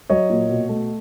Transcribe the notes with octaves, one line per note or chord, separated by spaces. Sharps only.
F#3 C#5 D#5
A#2
B2
A3